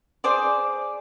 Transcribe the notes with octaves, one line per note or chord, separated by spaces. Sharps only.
G#4 C5 D5 D6